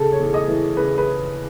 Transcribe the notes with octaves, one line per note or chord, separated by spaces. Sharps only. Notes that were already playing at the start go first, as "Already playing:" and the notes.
Already playing: C#3 A4
C#5
E2
D#5
E3
C#3 B4
B4